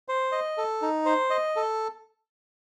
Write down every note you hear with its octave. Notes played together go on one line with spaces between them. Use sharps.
C5
D#5
A4
D#4
C5
D#5
A4